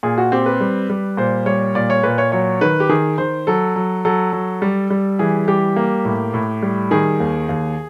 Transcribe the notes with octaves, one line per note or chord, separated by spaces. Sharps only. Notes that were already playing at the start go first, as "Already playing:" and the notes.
A#2 G#4
F#4
C4 G4
B4
G3
G3
A#2 C5
G3 C#5
A#2 D5
C#5
A#2 B4
C#5
F#3 C#5
D#3 B4
G4
D#3 G#4
D#3 C5
F#3 A4
F#3
F#3 A4
F#3
G3
G3
E3 G#4
G3 G4
A#3
A2
A2
G3
D#3 G#4
D#2
D#2